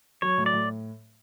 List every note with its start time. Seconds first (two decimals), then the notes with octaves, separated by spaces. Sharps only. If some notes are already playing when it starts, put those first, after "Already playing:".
0.22 F#3 C#5
0.38 A2
0.46 D5
0.53 A2